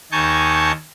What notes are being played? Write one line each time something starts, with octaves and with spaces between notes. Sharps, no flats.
D#2 D#4 G#5 A5 C#6 G6